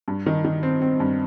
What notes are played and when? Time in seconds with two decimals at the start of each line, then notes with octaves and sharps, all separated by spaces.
0.08 G2
0.26 D#3
0.45 D#3
0.63 C4
0.82 C4
1.00 G2